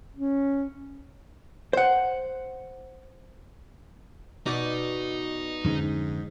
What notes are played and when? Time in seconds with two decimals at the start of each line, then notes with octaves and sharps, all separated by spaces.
0.16 C#4
1.73 C5 F#5
4.46 B2 D#4 D5
5.64 F2 G#2 D3 C#4